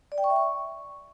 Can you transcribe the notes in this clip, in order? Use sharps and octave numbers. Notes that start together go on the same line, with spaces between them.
D5
G5
C#6
E5
C#6